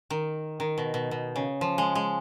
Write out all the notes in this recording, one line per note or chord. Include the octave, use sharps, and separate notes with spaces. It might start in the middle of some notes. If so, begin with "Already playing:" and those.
D#3
D#3
B2
B2
B2
C#3
F3
G#3
G#3